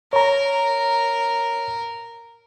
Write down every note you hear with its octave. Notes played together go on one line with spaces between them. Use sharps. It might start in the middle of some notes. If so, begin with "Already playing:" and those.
A#4 C#5 A#5